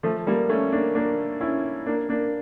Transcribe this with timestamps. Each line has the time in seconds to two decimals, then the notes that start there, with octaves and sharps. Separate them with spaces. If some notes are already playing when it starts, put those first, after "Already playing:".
0.03 F3 A3
0.27 G3 A#3
0.49 A3 C#4
0.72 A#3 D4
0.95 A#3 D4
1.41 C#4 E4
1.86 A#3 D4
2.09 A#3 D4